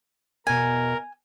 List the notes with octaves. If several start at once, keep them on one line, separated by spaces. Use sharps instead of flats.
E2 B2 A#4 G#5